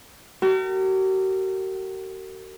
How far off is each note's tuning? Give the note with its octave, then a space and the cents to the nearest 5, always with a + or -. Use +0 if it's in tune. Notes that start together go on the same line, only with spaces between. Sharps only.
F#4 +45 A#4 -35